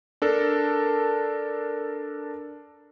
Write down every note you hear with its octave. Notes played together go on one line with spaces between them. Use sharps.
D4 A4 A#4